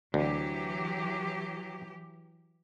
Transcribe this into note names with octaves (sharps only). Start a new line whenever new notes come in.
D2 E3 F#3 G4